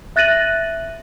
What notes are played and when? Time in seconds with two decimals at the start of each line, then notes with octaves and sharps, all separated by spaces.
0.16 E5 F#6 A6 A#6 D#7 F#7